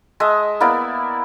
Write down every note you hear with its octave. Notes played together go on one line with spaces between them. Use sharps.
G#3 D#5 E5 A5
A#3 B3 E4 D5